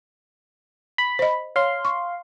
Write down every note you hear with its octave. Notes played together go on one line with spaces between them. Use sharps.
B5
C5 D#5
C#5 F5 C6
C#6